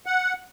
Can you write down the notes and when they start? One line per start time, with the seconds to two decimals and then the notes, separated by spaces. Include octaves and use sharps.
0.06 F#5